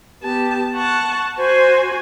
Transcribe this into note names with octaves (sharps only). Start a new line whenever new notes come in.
B3 G4 A5
F#5 A5 C#6
F#4 C5 G#5